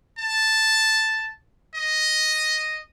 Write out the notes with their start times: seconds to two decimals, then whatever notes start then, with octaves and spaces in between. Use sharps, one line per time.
0.18 A5
1.74 D#5